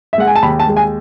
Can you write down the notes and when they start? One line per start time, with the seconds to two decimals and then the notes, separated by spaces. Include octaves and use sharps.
0.13 E5
0.18 G#3 F#5
0.27 G#5
0.35 A5
0.42 D#2 B5
0.60 A5
0.68 G#3
0.77 G#5